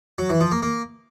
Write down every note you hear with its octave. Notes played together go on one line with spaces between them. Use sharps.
F#3
E3
F3
A#3
A#3